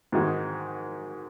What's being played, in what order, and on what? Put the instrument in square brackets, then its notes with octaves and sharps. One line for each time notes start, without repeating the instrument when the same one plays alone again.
[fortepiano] G#2 D#3 G#3 D#4 F#4